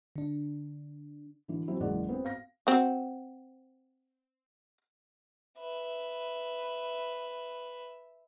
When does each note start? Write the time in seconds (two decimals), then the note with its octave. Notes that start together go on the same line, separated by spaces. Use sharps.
0.16 D3 D4
1.48 D3 E3
1.68 F3 F#3 C4 E4
1.80 F#1 E2 G#3 D5 F#5
2.09 B3 C4
2.25 F5 A#6
2.67 C4 F#4
5.58 B4 E5